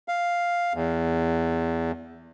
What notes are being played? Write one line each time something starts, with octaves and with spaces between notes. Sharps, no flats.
F5
E2